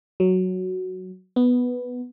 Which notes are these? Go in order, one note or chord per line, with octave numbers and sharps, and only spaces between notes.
F#3
B3